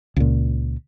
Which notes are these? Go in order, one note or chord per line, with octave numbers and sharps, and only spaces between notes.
C#2 A#2